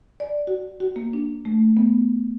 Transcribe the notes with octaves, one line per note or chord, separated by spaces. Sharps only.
D5
F#4
F#4
A#3
D4
A3
B3